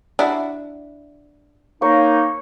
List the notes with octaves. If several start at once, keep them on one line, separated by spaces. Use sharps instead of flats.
D4 E4 F#4
A#3 D#4 C#5